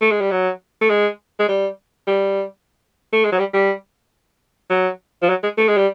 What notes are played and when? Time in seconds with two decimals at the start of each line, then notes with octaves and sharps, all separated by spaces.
0.01 A3
0.11 G#3
0.21 G3
0.31 F#3
0.81 A3
0.90 G#3
1.39 G#3
1.48 G3
2.07 G3
3.13 A3
3.24 G#3
3.32 F#3
3.39 G3
3.53 G3
4.70 F#3
5.22 F3
5.29 F#3
5.43 G#3
5.57 A3
5.68 G#3
5.77 G3